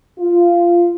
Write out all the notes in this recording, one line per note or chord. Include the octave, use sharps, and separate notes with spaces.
F4